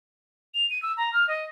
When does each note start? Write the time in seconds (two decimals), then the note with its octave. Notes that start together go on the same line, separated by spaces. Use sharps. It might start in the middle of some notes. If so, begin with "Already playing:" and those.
0.54 F7
0.70 D#7
0.83 E6
0.97 A#5
1.13 F6
1.28 D#5